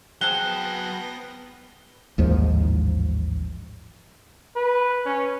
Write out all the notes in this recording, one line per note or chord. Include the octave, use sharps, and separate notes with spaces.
F#3 B3 C4 G#4 F#5 A5 A#6 G7
A1 D#2 G#2 F3
B4
C#4